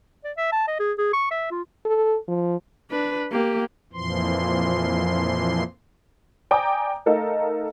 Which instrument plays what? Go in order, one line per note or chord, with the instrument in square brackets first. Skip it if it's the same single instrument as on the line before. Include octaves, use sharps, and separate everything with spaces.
[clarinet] D5
E5
A5
D#5
G#4
G#4
C#6
E5
F4
[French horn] A4
F3
[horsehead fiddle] D4 B4
A#3 G4
[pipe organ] F2 A#2 E3 F3 C6
[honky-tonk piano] D5 G5 G#5 A#5 D6 D#6
A3 D#4 A4 A#4 D#5 F5